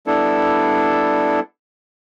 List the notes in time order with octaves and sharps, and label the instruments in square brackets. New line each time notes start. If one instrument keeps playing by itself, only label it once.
[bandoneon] G3 B3 D4 E4 A4